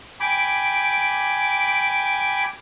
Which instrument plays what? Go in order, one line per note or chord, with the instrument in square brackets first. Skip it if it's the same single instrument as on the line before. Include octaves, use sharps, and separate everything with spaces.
[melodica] G5 G#5 B5 D6